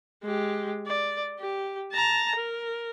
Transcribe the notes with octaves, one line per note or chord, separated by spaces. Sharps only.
G#3 G4
D5
G4
A5 A#5
A#4